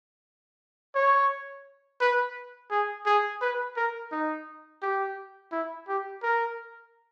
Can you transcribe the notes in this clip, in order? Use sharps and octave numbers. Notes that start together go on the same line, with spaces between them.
C#5
B4
G#4
G#4
B4
A#4
D#4
G4
E4
G4
A#4